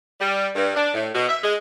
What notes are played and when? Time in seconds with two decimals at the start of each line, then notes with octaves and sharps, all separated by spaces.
0.20 G3
0.56 G2
0.75 D4
0.94 A2
1.14 B2
1.29 E5
1.42 G#3